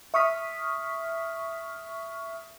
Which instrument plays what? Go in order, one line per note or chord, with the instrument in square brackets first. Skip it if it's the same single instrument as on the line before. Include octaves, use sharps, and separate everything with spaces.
[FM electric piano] E5 C#6 D#6 F6 B6